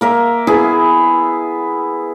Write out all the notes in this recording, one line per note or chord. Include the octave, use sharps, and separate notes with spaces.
A#3 A#4 E5
B3 E4 G#4